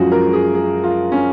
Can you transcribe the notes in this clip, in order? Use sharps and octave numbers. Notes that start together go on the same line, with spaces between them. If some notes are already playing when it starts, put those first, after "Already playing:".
Already playing: F#2 F3 G#3 F#4 G#4
A#4
G#4
G#4
F4
C#4